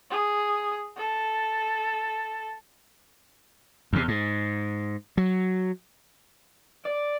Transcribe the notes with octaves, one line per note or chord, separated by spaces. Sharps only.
G#4
A4
E2 C3
G#2
F#3
D5